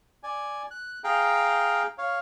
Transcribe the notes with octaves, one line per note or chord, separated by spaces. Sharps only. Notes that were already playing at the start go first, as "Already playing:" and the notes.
D5 G#5
F#6
G#4 F5 G5 A#5
C#5 F5